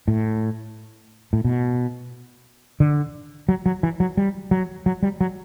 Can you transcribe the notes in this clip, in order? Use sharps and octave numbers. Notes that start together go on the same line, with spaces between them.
A2
A2
B2
D3
F#3
F#3
E3
F#3
G3
F#3
F#3
G3
F#3